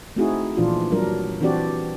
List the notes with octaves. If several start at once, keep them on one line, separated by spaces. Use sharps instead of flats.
A3 C4 D#4 E4 F#4 G#4
A#2 E3 F3 D4 F4
F#3 G3 D4 A#4
E3 C4 D4 F#4 G4 D5